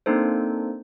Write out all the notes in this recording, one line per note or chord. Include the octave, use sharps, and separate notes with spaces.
A#3 C4 D4 D#4 A4 C5